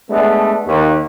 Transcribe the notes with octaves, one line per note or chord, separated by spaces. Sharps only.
G#3 A3 B3 D4
D#2